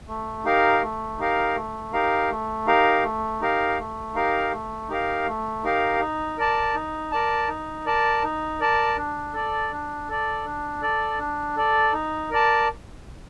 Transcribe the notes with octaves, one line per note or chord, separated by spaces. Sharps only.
A3
D#4 G4 A#4 F5
A3
D#4 G4 A#4 F5
A3
D#4 G4 A#4 F5
A3
D#4 G4 A#4 F5
A3
D#4 G4 A#4 F5
A3
D#4 G4 A#4 F5
A3
D#4 G4 A#4 F5
A3
D#4 G4 A#4 F5
D#4
A#4 D5 A5
D#4
A#4 D5 A5
D#4
A#4 D5 A5
D#4
A#4 D5 A5
D4
A4 D5
D4
A4 D5
D4
A4 D5
D4
A4 D5
D#4
A#4 D5 A5